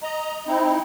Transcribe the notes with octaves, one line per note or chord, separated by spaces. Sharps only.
D#5 A#5
C4 D#4 E4